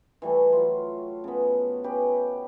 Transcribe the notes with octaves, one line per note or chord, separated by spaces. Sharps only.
E3 G3 A3
F#3 F4
C#3 B3
C#4 G4 B4